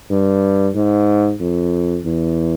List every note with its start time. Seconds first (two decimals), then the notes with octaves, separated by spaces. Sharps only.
0.11 G2
0.75 G#2
1.41 F2
2.05 E2